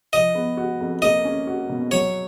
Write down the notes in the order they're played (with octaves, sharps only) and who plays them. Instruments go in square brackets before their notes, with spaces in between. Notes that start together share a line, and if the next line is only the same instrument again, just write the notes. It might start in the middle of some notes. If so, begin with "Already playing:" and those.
[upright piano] F3 [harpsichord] D#5
[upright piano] B3
F#4
F2
[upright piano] A#3 [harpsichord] D#5
[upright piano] C#4
F#4
B2
[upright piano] F#3 [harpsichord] C#5